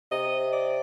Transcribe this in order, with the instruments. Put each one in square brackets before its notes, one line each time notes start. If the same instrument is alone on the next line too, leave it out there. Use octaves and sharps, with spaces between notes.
[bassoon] C3 [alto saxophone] D#5
[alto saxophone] D5